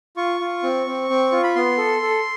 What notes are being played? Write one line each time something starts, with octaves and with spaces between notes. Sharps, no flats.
F4 C#6
F4
C4
C4
C4
F4
B5
B3 C6
A4
A4